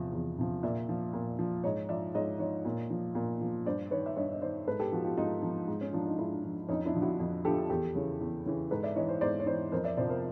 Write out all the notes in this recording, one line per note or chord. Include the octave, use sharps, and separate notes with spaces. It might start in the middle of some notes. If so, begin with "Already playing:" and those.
Already playing: E2 C3 F3
E2
C3 F3
A#2 D5 E5
F3
A#2
F3
G#2 C#5 D#5
F3 D5 E5
G#2 C#5 D#5
F3 C#5 D#5
A#2
F3
A#2
F3
G2 C5 D5
D#3 B4 C#5
E5
G2 C#5 D#5
D#5
D#3 C5 D5
G#2 A4 B4
G4 A4
F3 F#4
F4 G4
G#2 D#4 F4
F3
G#2
C#4
F3 D4
D#4
G#2 D4 E4
F3
F2 C#4 D#4
D4 E4
D3 F3
E4 F#4
F2
D3 F3 G4 A4
E2 G4 A4
C#3 E3
E2
C#3 E3
G#2 A4 B4
D5 E5
E3 C#5 D#5
C5 D5
G#2 C5 D5
C#5
E3 C5 D5
F2 A#4 C5
D5 E5
C3 F3 C5 D5
A#4 C5